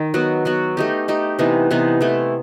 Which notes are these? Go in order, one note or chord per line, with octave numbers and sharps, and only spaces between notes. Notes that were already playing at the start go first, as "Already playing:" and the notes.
Already playing: D#3 D#4
F#3 B3 F#4
F#3 B3 F#4
A3 D#4 G4
A3 D#4 G4
C3 E3 B3 D#4
C3 E3 B3 D#4
E3 A3 E4